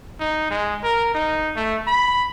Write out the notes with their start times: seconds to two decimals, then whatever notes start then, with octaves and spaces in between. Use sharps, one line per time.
0.20 D#4
0.50 G#3
0.84 A#4
1.14 D#4
1.56 A3
1.87 B5